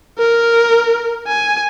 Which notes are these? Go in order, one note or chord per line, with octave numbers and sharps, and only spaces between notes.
A#4
G#5